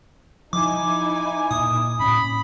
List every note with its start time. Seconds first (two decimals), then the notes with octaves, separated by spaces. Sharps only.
0.53 F3 D#4 E4 G#5 D6
1.51 A#2 D#6
2.00 A2 C#4 B5